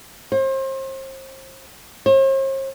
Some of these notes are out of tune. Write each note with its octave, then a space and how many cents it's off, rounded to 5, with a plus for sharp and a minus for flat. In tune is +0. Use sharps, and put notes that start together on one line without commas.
C5 +35
C5 +45